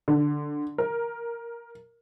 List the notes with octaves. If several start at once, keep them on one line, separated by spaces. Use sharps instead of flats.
D3
A#4